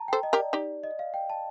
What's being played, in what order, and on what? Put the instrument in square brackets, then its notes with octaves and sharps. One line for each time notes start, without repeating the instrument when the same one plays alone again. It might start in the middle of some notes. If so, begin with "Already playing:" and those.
Already playing: [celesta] A5 A#5
[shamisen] A4 C5 [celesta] G5
[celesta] D#5
[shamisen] G4 A#4
[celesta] D5
[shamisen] D#4 G4 [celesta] D5
[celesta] D#5
F5
G5
A5